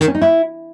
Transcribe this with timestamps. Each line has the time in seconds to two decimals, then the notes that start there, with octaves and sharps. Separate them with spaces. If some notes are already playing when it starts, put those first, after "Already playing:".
0.01 D#3
0.08 C#4
0.15 D#4
0.22 E4